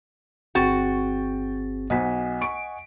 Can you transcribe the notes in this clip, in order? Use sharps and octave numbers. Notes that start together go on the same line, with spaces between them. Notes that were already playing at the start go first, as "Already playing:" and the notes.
G1 C4 F#4 G#4 G5 A6
B1 C5 D#5 F#5 G#5 B6
C#6 D7